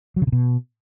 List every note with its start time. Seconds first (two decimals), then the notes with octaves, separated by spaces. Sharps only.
0.16 F#3
0.22 C#3
0.27 C3
0.32 B2